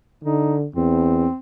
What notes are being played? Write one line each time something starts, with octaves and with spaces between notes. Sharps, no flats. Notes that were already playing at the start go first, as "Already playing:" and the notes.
D3 D#4
E2 C4